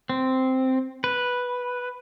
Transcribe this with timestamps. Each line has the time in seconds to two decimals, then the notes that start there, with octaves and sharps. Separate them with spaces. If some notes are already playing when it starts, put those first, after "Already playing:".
0.10 C4
1.04 B4